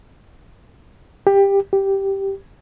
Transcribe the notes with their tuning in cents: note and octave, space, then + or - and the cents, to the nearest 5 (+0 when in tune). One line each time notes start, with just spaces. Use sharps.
G4 +15
G4 -5